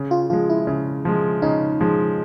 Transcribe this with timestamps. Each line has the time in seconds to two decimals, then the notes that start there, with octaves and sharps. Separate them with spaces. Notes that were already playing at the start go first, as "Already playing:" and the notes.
Already playing: C#3
0.11 F4
0.30 F3 G#3 F4
0.50 E4
0.67 C#3
1.05 F3 G#3
1.42 C#3 D#4
1.81 F3 G#3